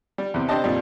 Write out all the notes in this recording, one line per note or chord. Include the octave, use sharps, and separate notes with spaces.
G3
E2 C3
C4 D4 G4 D#5 A5
F2 A#2 G3